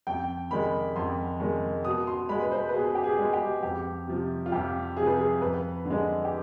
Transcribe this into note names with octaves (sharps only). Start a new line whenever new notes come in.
F2 G5
D#3 G#3 B5
F2 C6
D#3 G#3
B2 D#6
C6
G#3 B5
B4
C5
B4
B2 G#4
G4
G#4
G#3
G4
F2 G4
C3 F3
F4
F2 G4
C3 F3 G#4
B4
G#4
F2 B4
D3 G#3
G4